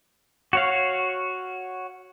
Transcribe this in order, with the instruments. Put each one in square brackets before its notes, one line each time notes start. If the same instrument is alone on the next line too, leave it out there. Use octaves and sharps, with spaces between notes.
[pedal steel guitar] F#4 C#5 F5